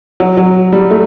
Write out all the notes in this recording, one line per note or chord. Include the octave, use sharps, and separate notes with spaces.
F#3
F#3
G3
A3